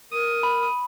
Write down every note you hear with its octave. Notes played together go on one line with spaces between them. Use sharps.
A#4 D#6
B5